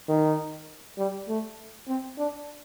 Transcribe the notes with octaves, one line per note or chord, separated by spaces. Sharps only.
D#3
G3
A3
C4
D4